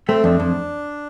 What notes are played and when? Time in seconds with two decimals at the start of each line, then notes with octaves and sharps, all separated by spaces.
0.08 A3 C4
0.24 F2 D4
0.40 F2